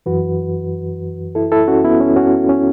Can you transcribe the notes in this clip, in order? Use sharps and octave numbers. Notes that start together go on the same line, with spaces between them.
F#2 E3 F#4 B4
E4 A4
E4 A4
C#4 F#4
B3 E4
C#4
C#4 F#4
C#4